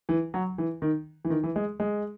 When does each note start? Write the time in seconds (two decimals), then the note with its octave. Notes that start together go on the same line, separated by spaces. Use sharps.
0.09 E3
0.34 F#3
0.58 E3
0.82 D#3
1.25 E3
1.30 D#3
1.44 E3
1.56 G#3
1.80 G#3